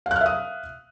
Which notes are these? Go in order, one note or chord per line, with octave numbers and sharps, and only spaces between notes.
E5 F5 D#6 F6 F#6